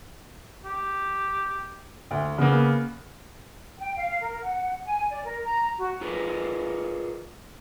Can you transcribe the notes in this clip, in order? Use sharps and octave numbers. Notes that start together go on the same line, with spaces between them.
G4
D2
C#3 A#3 B3
G5
F5
A#4
F#5
G#5
D5
A#4
A#5
F#4
F4 G#4 A#4 B4